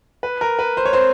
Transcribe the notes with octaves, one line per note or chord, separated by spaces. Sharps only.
B4
A#4
B4
C5
C#5
C4 C5